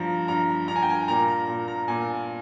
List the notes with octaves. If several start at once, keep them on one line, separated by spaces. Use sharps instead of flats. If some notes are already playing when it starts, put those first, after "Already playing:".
Already playing: G2 F3 A#5
G2 A#5
G2 A#5
G#5
G5
G#5
A#2 A#5
A#5
A#2
A#5
A#2 G#5